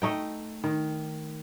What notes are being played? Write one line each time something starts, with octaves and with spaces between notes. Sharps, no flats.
A3 D#4 G5
D#3